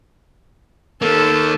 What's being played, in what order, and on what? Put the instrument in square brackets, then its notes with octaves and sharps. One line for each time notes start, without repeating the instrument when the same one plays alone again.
[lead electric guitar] D#3 A#3 [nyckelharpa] A4